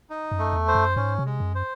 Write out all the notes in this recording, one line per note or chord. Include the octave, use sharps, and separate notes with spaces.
D#4
F#2
A3
E2
C5
F#2
G#2 C#4
C3
G#3
F#2
C5